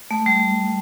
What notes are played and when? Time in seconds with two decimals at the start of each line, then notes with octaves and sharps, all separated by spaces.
0.11 A3
0.26 G3